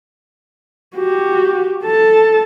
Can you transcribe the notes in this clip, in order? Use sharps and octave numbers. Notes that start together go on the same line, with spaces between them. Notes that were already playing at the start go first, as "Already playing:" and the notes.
F#4 G4
A4 A5